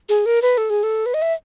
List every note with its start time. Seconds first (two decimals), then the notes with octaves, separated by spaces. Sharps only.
0.09 G#4
0.26 A#4
0.42 B4
0.57 A4
0.70 G#4
0.83 A4
1.06 B4
1.14 D#5
1.22 E5